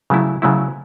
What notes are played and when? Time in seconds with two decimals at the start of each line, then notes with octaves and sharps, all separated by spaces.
0.10 C#3 F#3 A3 E4
0.42 C#3 F#3 A3 E4